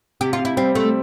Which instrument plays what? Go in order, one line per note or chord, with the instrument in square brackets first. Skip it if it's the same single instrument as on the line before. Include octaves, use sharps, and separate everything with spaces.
[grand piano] C3 [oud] G4
[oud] F4
[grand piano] C3
[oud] E4
[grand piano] G3 [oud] C4
[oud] A3 [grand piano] C4